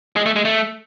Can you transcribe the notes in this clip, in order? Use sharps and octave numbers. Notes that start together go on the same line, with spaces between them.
G#3
A3
G#3
A3